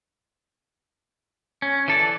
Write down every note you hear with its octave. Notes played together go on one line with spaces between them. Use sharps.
C#4
E3 A4 D5